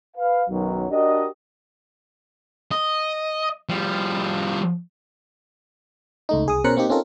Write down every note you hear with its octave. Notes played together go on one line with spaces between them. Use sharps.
B4 F5
B1 F#2 D#3 F#3
D4 F#4 G4 A#4 D#5
D#5
F3 G3
C#2 A3 D#4
C2 G#4 D#6
B2 C#4 A#4 C5 F#6 C#7
A#3 C4 D#4 G4
C4 C#4 D#4 F4 A4 A#4